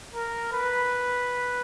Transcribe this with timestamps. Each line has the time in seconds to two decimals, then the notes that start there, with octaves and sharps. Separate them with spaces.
0.14 A#4
0.53 B4